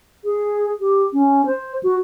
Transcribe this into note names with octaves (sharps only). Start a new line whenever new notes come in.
G#4
G4
C#4
C5
F#4